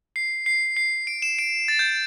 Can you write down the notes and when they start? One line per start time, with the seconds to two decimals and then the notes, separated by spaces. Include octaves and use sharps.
0.16 C7
0.46 C7
0.77 C7
1.07 D7
1.22 E7
1.39 D7
1.68 A6
1.79 G6